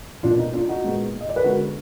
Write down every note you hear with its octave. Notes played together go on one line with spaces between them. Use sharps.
B2 A#3 D4 F4
D#4
D4 F4
D#4 F#4
A#2 G#3 B3
D#5
D5
B4
D3 G#3 B3 F#4 A#4